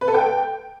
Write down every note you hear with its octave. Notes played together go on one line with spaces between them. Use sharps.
B4
A4
G5